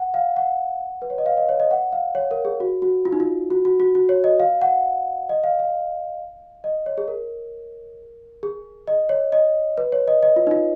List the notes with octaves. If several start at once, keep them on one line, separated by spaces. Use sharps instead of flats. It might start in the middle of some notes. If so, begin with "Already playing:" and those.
Already playing: F#5
F5
F#5
B4
C#5
D#5
F5
D#5
C#5
D#5
F#5
F5
C#5
A#4
G#4
F#4
F#4
F4
D#4
F4
F#4
F#4
F#4
F#4
C#5
D#5
F5
F#5
D#5
F5
F5
D#5
C#5
G#4
A#4
G#4
D#5
C#5
D#5
B4
C#5
D#5
D#5
F4
D#4
F4